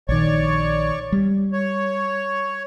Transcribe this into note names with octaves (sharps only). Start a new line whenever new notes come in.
A#1 D#3 C#5 D5 C#6
G3
C#5